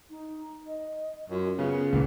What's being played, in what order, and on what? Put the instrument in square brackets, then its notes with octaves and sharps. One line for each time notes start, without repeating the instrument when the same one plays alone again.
[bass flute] D#4
D#5
[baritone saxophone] F#2 [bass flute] F4
[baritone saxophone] C#3 [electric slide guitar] B3
[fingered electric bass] C#2 [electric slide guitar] A#2 E3 [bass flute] F#5